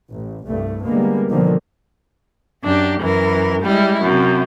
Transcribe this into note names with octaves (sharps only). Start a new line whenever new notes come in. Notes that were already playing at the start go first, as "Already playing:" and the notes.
A1
C2 G2 A3
D3 G3 G#3 A#3 B3
B2 D3 D#3 F3 A#3
F#2 D4 G4
F#2 E3 A#4
G3 G#3 E4
F#2 C3